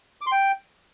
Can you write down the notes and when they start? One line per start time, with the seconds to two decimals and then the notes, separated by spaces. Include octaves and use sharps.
0.21 D6
0.27 C6
0.32 G5